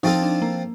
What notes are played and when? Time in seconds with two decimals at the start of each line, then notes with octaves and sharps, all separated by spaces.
0.03 F3 C4 D#4 F4 A4
0.15 D#4
0.22 D4
0.42 A#3